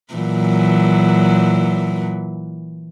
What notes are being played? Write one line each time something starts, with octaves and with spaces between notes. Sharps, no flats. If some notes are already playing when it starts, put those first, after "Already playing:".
A#2 E3 F#3